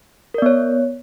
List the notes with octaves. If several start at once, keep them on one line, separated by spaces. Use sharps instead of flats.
B3 A#4 C#5 D5